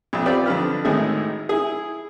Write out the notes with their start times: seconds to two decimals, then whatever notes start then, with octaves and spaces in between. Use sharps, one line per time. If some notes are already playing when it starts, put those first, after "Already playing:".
0.13 B1 F2
0.26 C4 F4 G4 B4 D5 G5
0.46 F2 D3 D4 B4 F6
0.85 G#1 A2 D#3 G#3 E4 G#4
1.49 E4 G#4